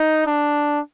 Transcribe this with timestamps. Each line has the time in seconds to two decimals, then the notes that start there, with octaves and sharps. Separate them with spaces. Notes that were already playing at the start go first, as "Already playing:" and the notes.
Already playing: D#4
0.27 D4